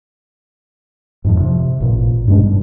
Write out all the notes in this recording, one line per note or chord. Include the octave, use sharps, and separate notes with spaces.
F2 G#2 F3
C3
A1 A#2
G2 B2 G#3 D4
G2